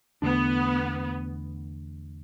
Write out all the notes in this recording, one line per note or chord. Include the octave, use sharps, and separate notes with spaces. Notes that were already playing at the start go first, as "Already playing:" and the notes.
E2 D3 A3 B3 D4